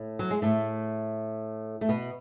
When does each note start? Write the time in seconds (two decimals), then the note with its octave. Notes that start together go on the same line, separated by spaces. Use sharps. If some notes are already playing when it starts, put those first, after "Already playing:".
Already playing: A2
0.19 F#3
0.30 G#3
0.42 A2 A3
1.81 A3
1.89 B2 B3